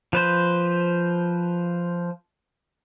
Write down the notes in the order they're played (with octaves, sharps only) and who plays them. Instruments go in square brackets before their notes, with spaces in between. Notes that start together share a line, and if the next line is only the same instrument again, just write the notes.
[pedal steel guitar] F3 B4 C5